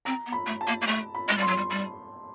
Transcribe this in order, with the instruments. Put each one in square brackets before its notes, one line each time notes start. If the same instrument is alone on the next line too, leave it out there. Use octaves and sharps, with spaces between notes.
[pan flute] C4 [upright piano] A#5
[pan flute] B3
[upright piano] B5
[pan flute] A3
[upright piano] A5
[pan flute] A#3
A#3
A3
[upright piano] B5
[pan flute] G#3
G3
[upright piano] C6
[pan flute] F#3
G3
G3